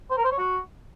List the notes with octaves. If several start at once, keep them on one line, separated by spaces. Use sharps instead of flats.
C5
A#4
C5
C#5
F#4